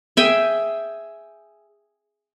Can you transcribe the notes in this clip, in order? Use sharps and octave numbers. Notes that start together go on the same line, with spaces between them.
G#4 E5 G5 G#5